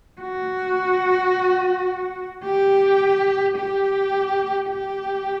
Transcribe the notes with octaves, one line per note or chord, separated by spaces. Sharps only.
F#4
G4
G4
G4